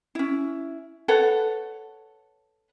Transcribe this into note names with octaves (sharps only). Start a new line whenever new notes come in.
C#4 E4
A4 B4 C#5 F#5